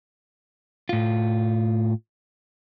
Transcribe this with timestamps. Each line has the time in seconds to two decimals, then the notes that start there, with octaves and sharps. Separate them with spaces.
0.89 A2 F4